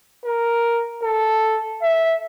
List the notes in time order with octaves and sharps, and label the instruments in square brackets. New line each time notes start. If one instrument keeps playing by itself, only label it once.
[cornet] A#4
A4
E5